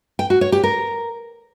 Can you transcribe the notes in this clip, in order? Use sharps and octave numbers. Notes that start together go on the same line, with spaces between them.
G5
F#4
C#5
G4
A#4